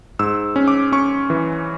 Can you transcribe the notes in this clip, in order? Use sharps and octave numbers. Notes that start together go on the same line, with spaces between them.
G#2 E6
C#4
D6
C#4 C#6
E3